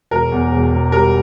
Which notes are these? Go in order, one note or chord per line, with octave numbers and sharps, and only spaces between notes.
E1 A#4
E2
E1
E1
G3 A#4